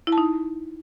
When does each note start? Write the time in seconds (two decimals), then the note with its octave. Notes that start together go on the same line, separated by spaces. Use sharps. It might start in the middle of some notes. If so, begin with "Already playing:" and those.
0.07 E4
0.12 A5
0.18 D#4